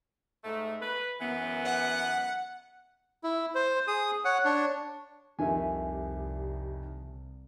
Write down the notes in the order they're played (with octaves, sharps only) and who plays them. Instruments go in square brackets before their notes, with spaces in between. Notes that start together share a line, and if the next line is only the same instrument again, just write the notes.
[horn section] G#2 A3
B4
F#2 E3 B3
[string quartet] F#5
[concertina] E4
C5
G#4 D#6
C#5 F#5
D4 C#5
[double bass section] C2 [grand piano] F2 D#3 [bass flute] G4 [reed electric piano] E5 G#5